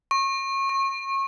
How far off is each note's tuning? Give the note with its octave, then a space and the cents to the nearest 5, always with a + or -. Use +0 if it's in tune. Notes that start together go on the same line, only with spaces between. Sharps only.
C#6 -30
C#6 -35